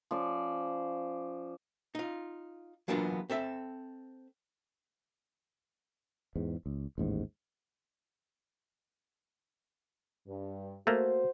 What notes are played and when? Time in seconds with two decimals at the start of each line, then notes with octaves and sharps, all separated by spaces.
0.11 F3 C#4 C5 D5
1.95 D#4 F4
2.88 E3 F#3 A#3 B3 D4 F4
3.30 C4 A4 E5
6.36 E2 G#2
6.66 C#2
6.98 A1 D#2 G#2
10.27 G2
10.87 A3 A#3 F#4 C5